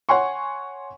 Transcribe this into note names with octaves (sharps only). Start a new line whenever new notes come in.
C#5 F#5 G#5 C6 C#6